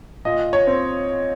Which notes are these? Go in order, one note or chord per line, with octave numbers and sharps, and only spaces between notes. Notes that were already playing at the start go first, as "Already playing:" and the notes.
A#2 D#5
C#5
C4